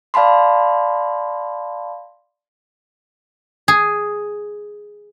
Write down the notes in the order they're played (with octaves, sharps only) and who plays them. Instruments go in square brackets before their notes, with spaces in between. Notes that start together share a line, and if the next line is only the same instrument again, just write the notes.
[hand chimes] D5 F5 A5 B5 C6
[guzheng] G#4